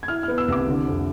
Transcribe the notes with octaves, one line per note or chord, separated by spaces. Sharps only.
G#6
E4 F6
B3 F6
E6
C2 D6
D3
F2